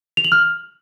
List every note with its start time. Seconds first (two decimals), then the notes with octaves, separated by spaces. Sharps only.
0.17 F7
0.24 F#7
0.32 F6